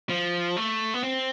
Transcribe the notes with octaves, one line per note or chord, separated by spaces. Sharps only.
F3
A3
B3
C4